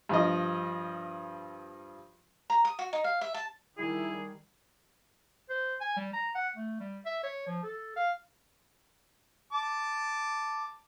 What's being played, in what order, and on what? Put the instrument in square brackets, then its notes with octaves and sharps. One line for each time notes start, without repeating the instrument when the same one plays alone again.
[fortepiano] G2 F3 D#5
[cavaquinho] A#5
D#6
F#4
D#4
F5
E5
A5
[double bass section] D#3 G3 [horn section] E4 [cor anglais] G#4
[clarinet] C5
G#5
G3
A#5
F#5
A3
G3
E5
C#5
F3
A4
F5
[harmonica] A5 D6